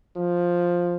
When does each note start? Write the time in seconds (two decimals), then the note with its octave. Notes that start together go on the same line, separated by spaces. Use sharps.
0.16 F3